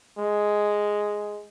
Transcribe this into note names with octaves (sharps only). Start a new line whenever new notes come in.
G#3